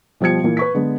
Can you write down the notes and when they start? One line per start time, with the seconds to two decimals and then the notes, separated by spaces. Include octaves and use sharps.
0.21 B2 F3 G3 G#6 C#7
0.44 A#2 E3 A#3
0.57 B4 C#6 B6
0.74 D3 G#3 B3